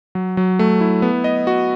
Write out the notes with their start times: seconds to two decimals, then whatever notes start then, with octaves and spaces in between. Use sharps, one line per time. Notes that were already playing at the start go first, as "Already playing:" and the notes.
0.15 F#3
0.37 F#3
0.59 A3
0.81 E4
1.02 B3
1.24 D#5
1.47 F#4